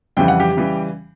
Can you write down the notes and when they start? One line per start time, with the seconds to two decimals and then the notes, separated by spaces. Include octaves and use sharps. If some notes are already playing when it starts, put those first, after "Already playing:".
0.17 F2 C#3 E3 G3 G5
0.28 F#5
0.40 G4 G5
0.57 C#3 E3 G3